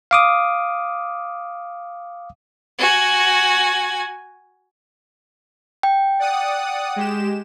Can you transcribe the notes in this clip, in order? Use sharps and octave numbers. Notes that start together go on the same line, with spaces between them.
F5 D6 D#6
F#4 G#5
G5
D5 F#5 D#6
G#3 G4 E7